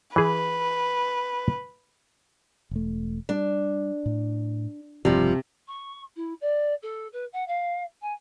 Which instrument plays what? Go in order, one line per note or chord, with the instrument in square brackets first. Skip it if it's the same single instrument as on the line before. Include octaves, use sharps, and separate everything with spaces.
[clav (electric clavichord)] E3 G#4 [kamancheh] B4
[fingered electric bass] E1 A3
[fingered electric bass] G3 [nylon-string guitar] D4
[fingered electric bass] A2
[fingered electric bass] E1 G2 [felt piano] C3 [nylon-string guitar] F3 G3
[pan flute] C#6
E4
D5
A4
B4
F#5
F5
G#5